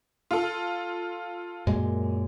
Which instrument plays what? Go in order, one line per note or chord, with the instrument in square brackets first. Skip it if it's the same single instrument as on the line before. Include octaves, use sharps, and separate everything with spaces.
[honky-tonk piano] F4 A4
[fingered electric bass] F#2 A#2 G#3